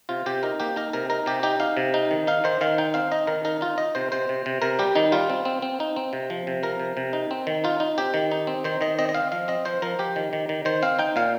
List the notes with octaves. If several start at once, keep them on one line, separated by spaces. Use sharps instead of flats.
C3 F4
C3 G4
D#4 A#4
A#3 G4
D#4 A#4
C3 A#4
D#4 A#4
C3 G4
D#4 G4
D#4 F5
C3
D#4
D#3
D#4 F5
D#3 C5
D#3 F5
D#4 G5
C4 F5
D#4 D#5
D#3 A#4
D#4 A#4
D#4 F4
D#4 D#5
C3 C5
C3 C5
C3
C3
C3 A#4
G3 G4
D#3 D#4
G3 F4
C4
C4
C4
D#4
C4
C3
F3
C3
F3 A#4
C3
C3
D#4
C4
D#3
D#4 F4
D#4
C4 G4
D#3
D#4
C4
D#3 C5
D#3 D#5
C4 D#5
D#5
C4 F5
F3 F5
C4 D#5
F3 C5
F3 A#4
F3 G4
D#3
D#3
D#3
D#3 C5
C4 F5
D#4 G5
A#2 F5